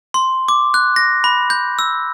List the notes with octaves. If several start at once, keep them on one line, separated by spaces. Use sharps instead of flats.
C6
D6
F#6
A#6
B5
G6
E6